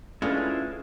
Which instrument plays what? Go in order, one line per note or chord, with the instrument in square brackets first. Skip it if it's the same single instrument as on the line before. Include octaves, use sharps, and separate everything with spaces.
[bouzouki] G#3 [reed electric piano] A3 D4 B4 [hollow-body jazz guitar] C#4 [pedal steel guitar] E4 F4 F5